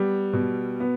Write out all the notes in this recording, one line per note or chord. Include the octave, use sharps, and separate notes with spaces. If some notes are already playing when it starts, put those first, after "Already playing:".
Already playing: G3 B3
B2
B3